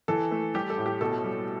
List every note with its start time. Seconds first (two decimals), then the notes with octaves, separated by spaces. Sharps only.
0.08 E3 A4
0.32 A3
0.55 G3 G4
0.70 A4
0.78 A2
0.86 G4
1.01 B2 A4
1.24 G3